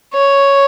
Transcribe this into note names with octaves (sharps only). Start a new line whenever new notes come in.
C#5